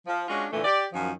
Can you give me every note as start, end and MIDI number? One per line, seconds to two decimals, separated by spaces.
0.07 0.24 53
0.28 0.46 56
0.28 0.46 61
0.28 0.46 62
0.28 0.46 65
0.28 0.46 66
0.52 0.61 46
0.52 0.61 50
0.52 0.61 52
0.52 0.61 57
0.64 0.85 67
0.64 0.85 74
0.93 1.11 42
0.93 1.11 51
0.93 1.11 53